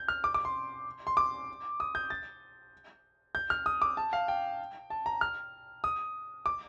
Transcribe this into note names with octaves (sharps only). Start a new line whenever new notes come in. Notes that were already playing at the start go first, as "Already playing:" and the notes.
Already playing: G6
F6
D6
D6
C6
C6
D6
D#6
G6
A6
G6
F6
D#6
D6
A5
F5
G5
A5
A#5
F6
D#6
D6